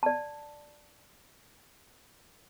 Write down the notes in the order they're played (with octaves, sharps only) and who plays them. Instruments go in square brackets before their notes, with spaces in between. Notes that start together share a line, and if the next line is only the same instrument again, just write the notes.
[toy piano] D5 A5